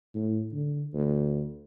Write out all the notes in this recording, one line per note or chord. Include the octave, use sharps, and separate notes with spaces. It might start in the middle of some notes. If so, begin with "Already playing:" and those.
A2
D3
D2